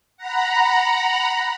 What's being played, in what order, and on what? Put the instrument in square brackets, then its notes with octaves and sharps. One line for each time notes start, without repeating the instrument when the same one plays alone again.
[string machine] F#5 A#5 B5